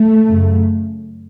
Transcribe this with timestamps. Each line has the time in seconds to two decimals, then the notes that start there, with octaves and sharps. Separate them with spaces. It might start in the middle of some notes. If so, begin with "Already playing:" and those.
Already playing: A3
0.28 F#2 C#3